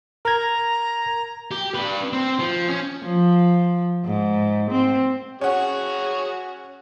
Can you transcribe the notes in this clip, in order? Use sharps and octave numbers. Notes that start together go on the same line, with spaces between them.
A#4 A#5 G#6
G4
D4 B4
C4
F3
C#4
F3
G#2
C4
C#4 F#4 G#4 C#5 F#5